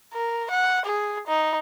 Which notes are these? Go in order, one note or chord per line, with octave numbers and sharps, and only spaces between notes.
A#4
F#5
G#4
D#4